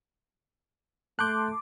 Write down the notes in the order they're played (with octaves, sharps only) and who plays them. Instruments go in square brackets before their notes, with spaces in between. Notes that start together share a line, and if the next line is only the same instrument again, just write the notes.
[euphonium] A3 [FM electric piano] A5 C6 D6 [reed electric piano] F#6 G6